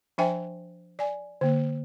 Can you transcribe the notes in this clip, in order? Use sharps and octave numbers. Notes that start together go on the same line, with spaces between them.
F3 D4 C5 E5 G5 G#5
D5 G#5
D3 A#3